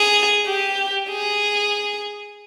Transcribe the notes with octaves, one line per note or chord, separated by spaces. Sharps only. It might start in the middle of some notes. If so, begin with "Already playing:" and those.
Already playing: G#4
G4
G#4